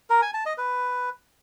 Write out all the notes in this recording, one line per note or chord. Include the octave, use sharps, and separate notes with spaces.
A#4
G#5
A5
D#5
B4